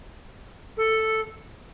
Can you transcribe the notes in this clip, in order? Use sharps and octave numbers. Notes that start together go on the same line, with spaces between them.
A4